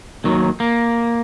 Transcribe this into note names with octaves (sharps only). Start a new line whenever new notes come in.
D#2 D#3 F#3
A#3